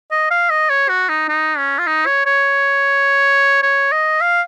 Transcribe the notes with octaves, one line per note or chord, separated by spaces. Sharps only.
D#5
F5
D#5
C#5
F#4
D#4
D#4
C#4
F4
D#4
C#5
C#5
C#5
D#5
F5